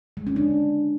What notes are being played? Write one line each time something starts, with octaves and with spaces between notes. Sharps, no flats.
G#3
C#4
D4